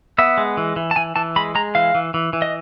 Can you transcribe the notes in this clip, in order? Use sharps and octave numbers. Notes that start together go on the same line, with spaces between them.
B3 E5
G#3
E3
E3
A5
E3 G#5
E3 A5
G#3 B5
G#3 A#5
E3 F5
E3
E3
E3
D#5